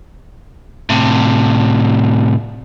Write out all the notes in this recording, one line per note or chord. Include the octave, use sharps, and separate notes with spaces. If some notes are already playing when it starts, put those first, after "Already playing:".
A2 C3